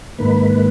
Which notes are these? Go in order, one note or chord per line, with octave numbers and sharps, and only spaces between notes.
G#2 D#3 A#3 B4